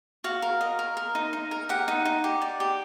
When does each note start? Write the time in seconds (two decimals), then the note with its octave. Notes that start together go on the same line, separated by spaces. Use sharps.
0.24 F#4 F5
0.42 A#4
0.61 D#5
0.79 A#4
0.97 A#4
1.15 D#4
1.33 D#4
1.51 A#4
1.69 G4 F#5
1.88 D#4
2.05 D#4
2.24 G4
2.42 D5
2.60 G4